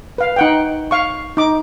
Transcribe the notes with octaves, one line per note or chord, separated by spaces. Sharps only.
B4 F5
D#4 F#5 G5
F5 C#6
D#4 D6